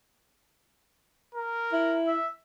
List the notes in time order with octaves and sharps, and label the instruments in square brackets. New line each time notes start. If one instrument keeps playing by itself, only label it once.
[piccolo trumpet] A#4
[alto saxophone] E4
[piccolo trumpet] E5